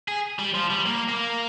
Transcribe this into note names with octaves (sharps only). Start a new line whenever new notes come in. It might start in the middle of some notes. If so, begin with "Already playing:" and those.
G#4
G3
F3
G3
A#3
A#3